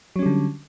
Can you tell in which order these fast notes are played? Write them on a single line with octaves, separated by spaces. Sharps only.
F#3 C#4 G3 D3